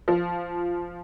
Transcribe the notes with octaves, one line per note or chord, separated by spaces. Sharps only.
F3